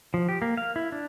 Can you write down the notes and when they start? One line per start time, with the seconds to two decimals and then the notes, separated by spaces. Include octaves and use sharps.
0.14 F3
0.29 G4
0.42 A#3
0.57 F5
0.76 E4
0.92 D4